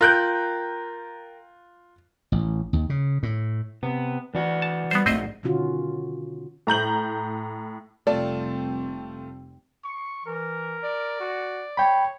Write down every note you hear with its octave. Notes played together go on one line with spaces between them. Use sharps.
F4 A#4 G5 F#6 G6
A1
D#2
C#3
A2
C3 B3
E3 D4 F#4
A5
G3 B3 C5
A#1 G#2 A3 C4 C5 D#5
B2 D3 D#3 C#4 F4 F#4
A2 A#5 G6 F#7
F1 G3 A3 C4 F4 D5 A5
C#6
E3 A#4
D5
F#4
C#5 G5 B5